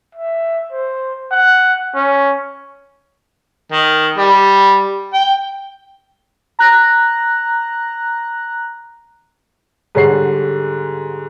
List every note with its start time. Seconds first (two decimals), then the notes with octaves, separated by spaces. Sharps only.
0.15 E5
0.72 C5
1.31 F#5
1.95 C#4
3.72 D#3
4.17 G3
5.13 G5
6.59 A#5 F#6 A#6
9.95 G#2 D3 G3 C#5 F#5 C7